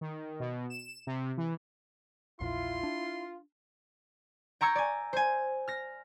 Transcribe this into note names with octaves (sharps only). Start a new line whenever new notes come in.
D#3
B2
E7
C3
E3
A#1 E2 A#2 E4 F4 C6
D4
G5 A#5 C#6 E6 G#6
D5 G#5
C5 G#5
F6 A#6